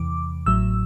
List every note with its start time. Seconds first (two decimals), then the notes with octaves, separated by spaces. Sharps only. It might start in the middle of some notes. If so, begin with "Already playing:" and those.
Already playing: E2 C3 E3 D6
0.46 A1 A2 F#3 E6